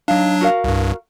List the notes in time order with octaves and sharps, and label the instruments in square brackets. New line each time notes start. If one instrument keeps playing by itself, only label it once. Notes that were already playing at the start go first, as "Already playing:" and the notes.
[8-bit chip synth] F#3 D4 [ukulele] D#4 F5
[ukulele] F#4 A#4 F5
[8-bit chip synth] C2 G2